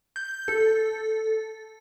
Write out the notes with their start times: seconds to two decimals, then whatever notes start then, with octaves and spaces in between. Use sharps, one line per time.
0.16 G6
0.48 A4